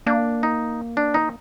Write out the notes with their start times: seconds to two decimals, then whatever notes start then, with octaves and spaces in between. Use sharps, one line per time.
0.06 A#3 D4
0.43 D#4
0.97 D4
1.14 D#4